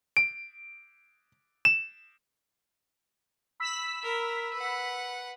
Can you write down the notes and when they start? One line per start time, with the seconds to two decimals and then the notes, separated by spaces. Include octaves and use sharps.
0.17 D7
1.65 E7
3.60 B5 E6 B6
4.03 A#4
4.54 B4 F#5